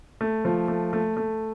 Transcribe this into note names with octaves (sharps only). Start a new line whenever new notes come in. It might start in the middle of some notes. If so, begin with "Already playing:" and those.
A3
F3
A3
A3
A3